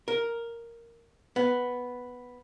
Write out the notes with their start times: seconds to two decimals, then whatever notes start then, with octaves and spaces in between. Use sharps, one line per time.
0.08 A#4
1.36 B3